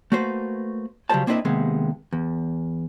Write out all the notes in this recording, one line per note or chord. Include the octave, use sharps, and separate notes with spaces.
A3 A#3 F#4 B4 C5
C#3 F#3 G3 F4 C5 A5
A#3 C4 D4 E4 B4 D#5
D#2 C3 G#3 B3
E2